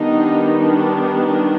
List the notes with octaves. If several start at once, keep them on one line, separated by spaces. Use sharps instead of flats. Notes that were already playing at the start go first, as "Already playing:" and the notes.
Already playing: D#3 G3 B3 D4 D#4
D4
D4